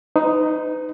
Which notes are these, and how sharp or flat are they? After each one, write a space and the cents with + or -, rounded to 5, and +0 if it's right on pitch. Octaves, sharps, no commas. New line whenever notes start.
D#4 +0 B4 +40